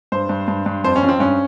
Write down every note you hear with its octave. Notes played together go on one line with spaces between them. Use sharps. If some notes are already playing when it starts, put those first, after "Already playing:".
G2 C5
G2
G2
G2
F2 C5
C#4
F2
C4
G2 C#4